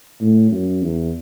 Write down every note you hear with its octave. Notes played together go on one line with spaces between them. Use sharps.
A2
F#2
E2